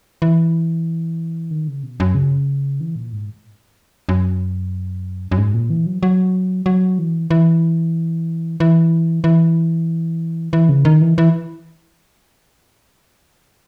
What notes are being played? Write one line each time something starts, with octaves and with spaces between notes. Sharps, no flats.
E3
D#3
C#3
B2
F#2
C#3
E3
A#2
G#2
F#2
F#2
G#2
A#2
E3
F#3
F#3
F#3
E3
E3
E3
E3
E3
C#3
D#3
E3
E3